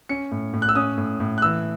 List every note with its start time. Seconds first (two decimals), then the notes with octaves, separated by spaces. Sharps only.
0.09 C#4 C#7
0.31 A2
0.53 A2
0.62 F#6
0.69 E6
0.75 C#4 D#6
0.98 A2
1.20 A2
1.38 F#6
1.42 E3 E6